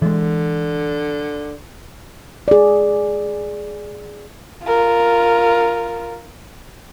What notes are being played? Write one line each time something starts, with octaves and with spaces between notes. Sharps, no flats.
D3 E3 G#3
G#4 D5
F4 A#4